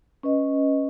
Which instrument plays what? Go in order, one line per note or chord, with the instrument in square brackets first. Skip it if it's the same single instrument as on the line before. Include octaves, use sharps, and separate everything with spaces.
[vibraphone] C#4 B4 D#5